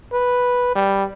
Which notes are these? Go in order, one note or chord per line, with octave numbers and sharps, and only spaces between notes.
B4
G3